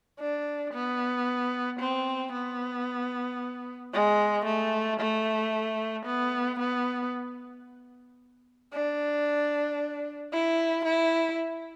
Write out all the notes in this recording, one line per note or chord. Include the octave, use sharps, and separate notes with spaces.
D4
B3
C4
B3
G#3
A3
A3
B3
B3
D4
E4
E4